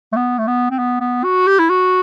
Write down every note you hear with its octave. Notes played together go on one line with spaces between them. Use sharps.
A3
B3
A3
B3
C4
B3
B3
F#4
G4
E4
F#4